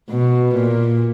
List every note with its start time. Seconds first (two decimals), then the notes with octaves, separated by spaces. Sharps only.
0.10 B2
0.54 A#2